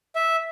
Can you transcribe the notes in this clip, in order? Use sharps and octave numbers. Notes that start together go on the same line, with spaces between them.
E5